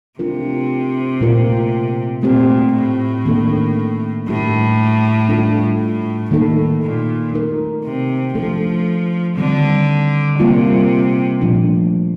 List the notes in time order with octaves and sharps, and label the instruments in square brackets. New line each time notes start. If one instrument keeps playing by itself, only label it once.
[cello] C3 [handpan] A3 D4 F4 A#4
[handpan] A#2 A3 C4 F4 A#4
[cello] A#2 [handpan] A3 C4 G4
[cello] A2
[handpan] D#3 A#3 D4 A4
[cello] A2 [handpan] G3 D4 G4 A#4
[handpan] G3 D4 F4 A4
[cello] A2
[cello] A2 [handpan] D#3 A#3 D#4 A4
[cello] A#2
[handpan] A3 D#4 A#4
[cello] C3
[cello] F3 [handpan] A3 D4 A4
[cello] D3 [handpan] D#3 G3 C4
[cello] C3 [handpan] G3 A#3 F4
[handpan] A#2 F3 A3 D4